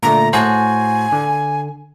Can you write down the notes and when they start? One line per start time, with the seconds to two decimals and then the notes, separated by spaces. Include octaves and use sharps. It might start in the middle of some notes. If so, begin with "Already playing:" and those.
0.03 A#2 D3 A3 A#5
0.33 A2 F#4 C5 G#5
1.13 D3